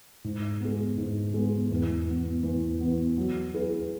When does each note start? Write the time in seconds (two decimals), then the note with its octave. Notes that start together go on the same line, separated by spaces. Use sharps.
0.24 G#2
0.60 G#3 B3
0.98 G#2
1.34 G#3 B3
1.71 E2
2.07 E3 B3
2.43 E2
2.80 E3 B3
3.18 F#3
3.54 E4 G#4 B4